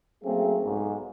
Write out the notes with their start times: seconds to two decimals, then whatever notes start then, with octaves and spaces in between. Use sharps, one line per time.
0.24 F#3 A3 A#3 C4 C#4 G#4
0.63 B1 G#2